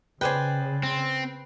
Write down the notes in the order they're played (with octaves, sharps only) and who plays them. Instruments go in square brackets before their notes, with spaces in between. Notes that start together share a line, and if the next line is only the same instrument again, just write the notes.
[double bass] C#3 [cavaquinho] G#4 D5 G5 [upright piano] B4 C5
[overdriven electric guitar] C4